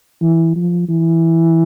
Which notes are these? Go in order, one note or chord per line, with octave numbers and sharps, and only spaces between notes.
E3
F3
E3